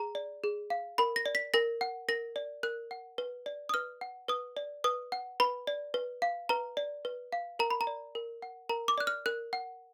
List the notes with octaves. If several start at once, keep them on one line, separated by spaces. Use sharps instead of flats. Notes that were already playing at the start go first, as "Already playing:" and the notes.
Already playing: G#4 A#5
D5
G#4
F5
A#4 B5
A#6
D5
B6
A#4 A#6
F#5
A#4 A#6
D5
A#4 F#6
F#5
B4
D5
D#6
B4 F6
F#5
B4 D#6
D5
B4 D#6
F#5
B4 B5
D5
B4
F5
B4 A#5
D5
B4
F5
A#4 A#5
B5
A#5
D5
A#4
F#5
A#4 A#5
D6
D5 F#6
F6
A#4 F#6
F#5